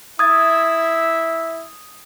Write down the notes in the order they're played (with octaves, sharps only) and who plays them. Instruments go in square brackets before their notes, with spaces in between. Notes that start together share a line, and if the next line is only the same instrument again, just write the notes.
[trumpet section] E4 E5 [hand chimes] D#6 G#6 A6